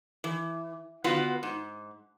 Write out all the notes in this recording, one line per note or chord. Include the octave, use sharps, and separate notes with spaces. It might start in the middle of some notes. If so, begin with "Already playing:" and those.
E3
D3 B3 F4 F#4 B4
G#2